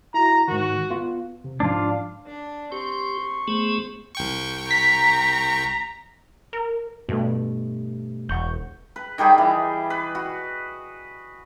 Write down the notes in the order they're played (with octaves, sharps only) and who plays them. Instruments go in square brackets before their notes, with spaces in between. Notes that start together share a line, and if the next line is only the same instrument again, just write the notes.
[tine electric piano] E4 F#4 [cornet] A#5
[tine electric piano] G#2 D#3 [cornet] F#4
[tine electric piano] B3 F4
C3
[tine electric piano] G#2 F3 [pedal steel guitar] D4 F4
[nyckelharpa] D4
[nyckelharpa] C4 C6 [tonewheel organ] G4 [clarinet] C#6
[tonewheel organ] A3 B3 G#4 [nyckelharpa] C5
[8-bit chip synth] C2 G5 C#6
[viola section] A#5 [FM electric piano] B6
[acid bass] A#4
[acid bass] G2 [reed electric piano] B2 A3
[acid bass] E1 [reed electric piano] F#5 C#6 G6
[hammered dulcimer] B4
D#3 G3 G#4 G5
E3
B4
F#4